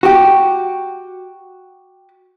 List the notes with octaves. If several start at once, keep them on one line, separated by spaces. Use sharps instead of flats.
F#4 G4